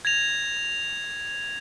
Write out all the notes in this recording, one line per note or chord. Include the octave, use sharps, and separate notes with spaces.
G#6 A#6 F7